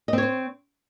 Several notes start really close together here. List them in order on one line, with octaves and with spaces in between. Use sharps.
D#5 C4 C#5 C5